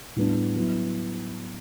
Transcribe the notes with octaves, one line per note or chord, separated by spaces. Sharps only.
A2 G3 B3 D4
F#3 B3 E4